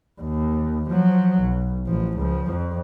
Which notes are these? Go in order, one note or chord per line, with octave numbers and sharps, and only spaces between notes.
D#2
F3 F#3
B1
A1 F3
C#2 F3
F2